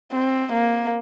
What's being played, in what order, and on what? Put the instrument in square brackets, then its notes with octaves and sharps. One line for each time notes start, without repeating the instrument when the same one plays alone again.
[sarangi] C4
A#3